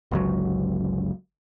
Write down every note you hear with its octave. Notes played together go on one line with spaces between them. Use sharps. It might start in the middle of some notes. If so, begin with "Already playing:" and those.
G1 C#2 F#3